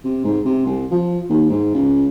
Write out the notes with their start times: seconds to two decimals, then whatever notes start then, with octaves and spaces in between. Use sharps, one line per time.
0.04 C3
0.24 G#2
0.45 C3
0.65 C2
0.91 F3
1.29 D#2
1.49 G#2
1.74 C#2